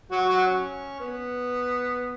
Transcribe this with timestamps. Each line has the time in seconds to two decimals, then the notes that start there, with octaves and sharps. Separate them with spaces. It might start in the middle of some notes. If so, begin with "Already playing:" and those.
0.11 F#3 F#4
0.29 F#3 F#4
0.47 C#4
1.00 B3